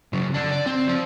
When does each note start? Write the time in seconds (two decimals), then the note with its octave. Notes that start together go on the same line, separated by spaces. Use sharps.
0.13 C#3 F#3
0.34 D3 D4
0.51 D5
0.66 C4
0.88 F3